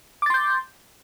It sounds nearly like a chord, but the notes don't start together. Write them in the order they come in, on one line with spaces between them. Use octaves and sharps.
D6 A6 C6 G6